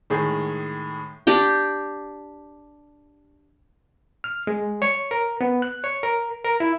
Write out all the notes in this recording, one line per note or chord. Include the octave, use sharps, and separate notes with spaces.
A2 D#3 G#3 G#4
D4 G4 G5
F6
G#3
C#5
A#4
B3
F#6
C#5
A#4
A#4
E4